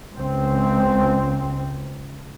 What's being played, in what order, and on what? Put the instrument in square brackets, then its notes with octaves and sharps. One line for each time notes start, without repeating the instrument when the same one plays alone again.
[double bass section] C#2 C4